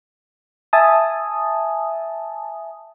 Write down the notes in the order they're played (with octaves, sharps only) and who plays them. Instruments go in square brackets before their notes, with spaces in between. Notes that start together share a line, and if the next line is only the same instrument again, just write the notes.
[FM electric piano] E5 G#5 A5 D#6